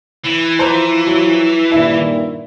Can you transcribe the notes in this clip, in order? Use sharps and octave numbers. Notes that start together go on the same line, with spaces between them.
E3
F3 F4 C5 A#5 G6
F#3
G2 A#2 D#3 E4